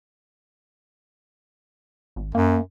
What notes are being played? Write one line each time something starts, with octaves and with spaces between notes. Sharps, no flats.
G#1
F#2 A#3